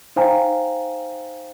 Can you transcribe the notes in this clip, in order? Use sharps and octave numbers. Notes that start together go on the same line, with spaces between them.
D#4 C5 F5 G5 G#5 A#5